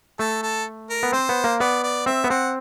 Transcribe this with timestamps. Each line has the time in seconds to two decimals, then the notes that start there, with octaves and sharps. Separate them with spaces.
0.19 A3 A4
0.43 A4
0.90 A#4
1.03 B3
1.12 C4 C5
1.29 B3
1.44 A#3
1.60 B3 D5
1.83 D5
2.06 C4 E5
2.24 B3
2.30 C4 F#5